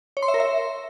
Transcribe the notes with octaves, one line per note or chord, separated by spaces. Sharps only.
C#5
C6
E5
A#4
E5